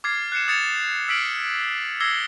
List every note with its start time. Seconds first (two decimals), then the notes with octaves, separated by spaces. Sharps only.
0.04 D6 F6 G#6 A6 C7
0.32 F#6 C7 C#7 E7
0.48 D#6 G#6 A6 C#7 E7 F7
1.08 E6 F6 B6 C7 D7 F#7
2.00 D6 E6 G#6 A#6 C7 G7